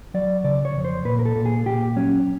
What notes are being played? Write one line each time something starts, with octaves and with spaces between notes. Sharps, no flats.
F#3 D5
C#3 D5
C#5
F2
C5
A#2 B4
A#4
A4
A#2
G#4
A#2 G4
F#3 C#4